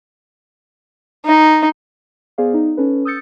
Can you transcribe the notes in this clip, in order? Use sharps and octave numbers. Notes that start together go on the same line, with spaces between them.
D#4
B3 G#4 C5 D5 F5
D#4
C#4 A4 B4
D#6 E6 G6 A6 C#7